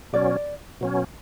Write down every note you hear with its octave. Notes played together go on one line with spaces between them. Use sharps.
B2 F#3 C#4 D5
B2 F#3 C#4